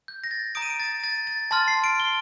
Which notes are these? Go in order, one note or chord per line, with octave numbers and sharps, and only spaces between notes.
G6
A#6
A6
A#5 D#6 G6 D7
D#7
D7
A6
A6
A6
A5 C6 F6 A6
C7
D7
G7